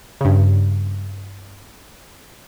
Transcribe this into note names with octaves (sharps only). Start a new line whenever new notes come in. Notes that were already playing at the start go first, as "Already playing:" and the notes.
G2 C#3